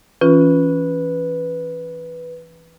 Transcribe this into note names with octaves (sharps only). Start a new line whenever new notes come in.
E3 C#4 F4 B4